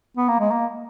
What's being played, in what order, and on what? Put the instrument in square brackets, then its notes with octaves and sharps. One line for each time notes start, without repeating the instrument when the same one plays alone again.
[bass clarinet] B3
A#3
G#3
A#3